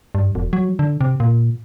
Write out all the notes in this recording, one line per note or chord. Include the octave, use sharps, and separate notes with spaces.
G2
E1
F#3
D3
C3
A#2